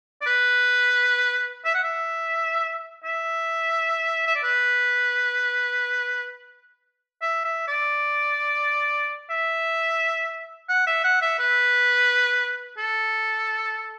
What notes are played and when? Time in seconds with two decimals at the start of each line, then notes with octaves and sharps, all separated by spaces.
0.22 D5
0.26 B4
1.65 E5
1.74 F#5
1.83 E5
3.04 E5
4.27 E5
4.35 D5
4.43 B4
7.22 E5
7.45 E5
7.68 D5
9.30 E5
10.69 F#5
10.87 E5
11.04 F#5
11.22 E5
11.39 B4
12.78 A4